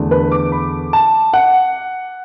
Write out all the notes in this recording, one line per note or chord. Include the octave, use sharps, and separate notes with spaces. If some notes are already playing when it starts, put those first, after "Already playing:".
Already playing: E2 D3 A3
B4
D6
B5
A5
F#5